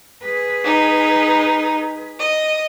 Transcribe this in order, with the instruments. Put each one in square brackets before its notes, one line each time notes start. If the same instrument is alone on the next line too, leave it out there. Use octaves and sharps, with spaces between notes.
[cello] G#4 B4
[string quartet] D#4
D#5